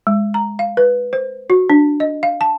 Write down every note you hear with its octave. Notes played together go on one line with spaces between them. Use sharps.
G#3
A#5
F5
B4
C5
F#4
D4
D#5
F5
A5